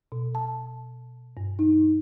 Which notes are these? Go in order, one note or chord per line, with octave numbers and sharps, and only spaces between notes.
B2
A5
G2
D#4